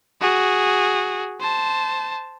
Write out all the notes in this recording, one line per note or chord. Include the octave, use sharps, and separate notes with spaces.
F#4 G#4
C5 A5